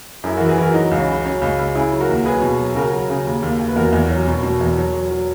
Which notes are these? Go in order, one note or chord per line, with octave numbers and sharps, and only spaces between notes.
F#2 E4 G#4
E3 F#4 A#4
G#4 B4
E3 F#4 A#4
F#3 D#4 F#4
C#2
C#4
C#3
F#3 C#4
C#2
C#2
C#3 E4 G#4
F#3
F#4 A#4
D#2
F#3 G#4 B4
B2
F#3
C#3 F#4 A#4
F#3
C#3
D#2
D#2
D#2
B4
E2 F#4 A#4
E2
F#3
B2
B2
E2
F#3
F#3
F#3